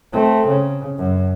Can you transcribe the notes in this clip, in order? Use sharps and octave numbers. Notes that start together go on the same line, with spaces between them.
A3 C4
C#3
F#2